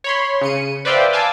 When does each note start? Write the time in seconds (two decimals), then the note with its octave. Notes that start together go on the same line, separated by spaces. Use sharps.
0.04 C#5 B5 C6
0.41 C#3 C#7 D#7
0.85 B4 C5 D5 E5 F5 G5
1.13 F5 G#5 A5 D6 E6